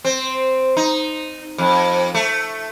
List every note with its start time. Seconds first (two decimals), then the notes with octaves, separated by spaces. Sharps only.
0.05 C4
0.77 D#4
1.58 F2
2.14 A3